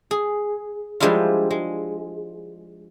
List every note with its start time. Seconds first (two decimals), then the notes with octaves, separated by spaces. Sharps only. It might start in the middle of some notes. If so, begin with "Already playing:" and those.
0.11 G#4
1.00 F3 G3 G#3 D4 E4 F4
1.51 G#3